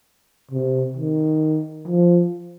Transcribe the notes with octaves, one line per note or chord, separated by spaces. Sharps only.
C3
D#3
F3